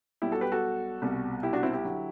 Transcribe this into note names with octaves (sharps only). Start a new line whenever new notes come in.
B1 B2 G3 E4 G4
F#4 A4
G4 B4
F#4 A4
C2 B2 G3
E4 G4
D4 F#4
C4 E4
E4 G4
D3 F#3